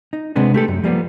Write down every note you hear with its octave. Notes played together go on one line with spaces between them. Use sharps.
D#4
C3 G#3 B3 C4 D4
A3 G4 A4
F#2
F3 G3 A#3 B3